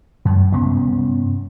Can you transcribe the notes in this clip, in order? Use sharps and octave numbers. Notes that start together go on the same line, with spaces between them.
F#2
G2 C3 B3 C#4